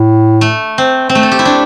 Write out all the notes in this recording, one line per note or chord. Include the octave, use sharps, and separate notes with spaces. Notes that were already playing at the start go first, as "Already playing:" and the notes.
Already playing: A2
A3
C4
C4
A3
A4
G4
E4
D4